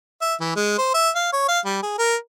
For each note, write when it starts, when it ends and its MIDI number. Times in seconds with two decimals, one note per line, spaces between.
0.21 0.35 76
0.41 0.56 52
0.56 0.77 56
0.78 0.92 72
0.94 1.10 76
1.16 1.29 77
1.33 1.44 73
1.49 1.60 77
1.65 1.78 55
1.83 1.97 68
1.99 2.16 70